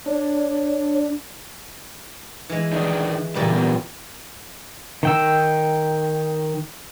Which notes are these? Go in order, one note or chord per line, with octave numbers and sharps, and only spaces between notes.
D4 C#5
E3 G#3
D#3 D4 D#4
A#2 C#3 E3 G3 G4 A4
F#3 B3 E4
D#3 G5 E6